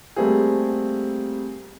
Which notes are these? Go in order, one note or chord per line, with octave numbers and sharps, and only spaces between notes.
G3 A3 A#3 C4 G4 G#4